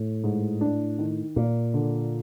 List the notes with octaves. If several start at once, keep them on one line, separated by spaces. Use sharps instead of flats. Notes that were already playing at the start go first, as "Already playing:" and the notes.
Already playing: A2
G#2
D4
D#3
A#2 A#3
D3